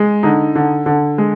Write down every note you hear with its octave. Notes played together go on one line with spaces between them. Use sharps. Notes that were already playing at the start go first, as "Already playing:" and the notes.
Already playing: G#3
D3 D#4
D3
D3
G#3